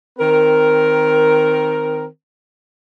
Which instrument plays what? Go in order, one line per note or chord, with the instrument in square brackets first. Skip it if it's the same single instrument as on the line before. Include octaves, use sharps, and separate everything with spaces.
[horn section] D#3 C4 A#4